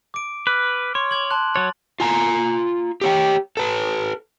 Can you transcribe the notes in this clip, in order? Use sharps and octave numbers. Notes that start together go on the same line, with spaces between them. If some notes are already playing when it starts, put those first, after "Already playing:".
D6 D7
B4 D6 F6
C#5 C6
D6 G#6 F#7
A5 C6 F#6
F#3 C#5 A6
F4 G#5 A#5
G4 C#5 G5
A4 B4